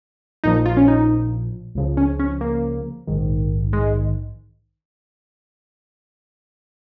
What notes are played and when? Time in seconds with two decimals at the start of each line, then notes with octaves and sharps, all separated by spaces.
0.44 A#1 A#2 F3 D#4
0.66 F4
0.77 C#4
0.88 D#4
1.75 C#2 C#3 F3
1.97 C#4
2.19 C#4
2.41 A#3
3.07 A#1 G#2 D#3
3.73 G#3